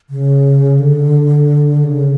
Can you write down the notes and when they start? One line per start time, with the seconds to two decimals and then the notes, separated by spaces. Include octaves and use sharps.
0.10 C#3
0.79 D3
1.84 C#3